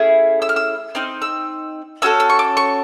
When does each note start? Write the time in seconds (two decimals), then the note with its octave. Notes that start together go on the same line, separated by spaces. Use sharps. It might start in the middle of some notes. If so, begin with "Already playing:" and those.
Already playing: A3 C#4 E4 G#4
0.42 E6
0.49 F6
0.56 E6
0.95 C4 D#4 F6
1.22 E6
2.02 C#4 F#4 A4 E6
2.20 E6
2.29 C#6
2.39 D6
2.57 C#6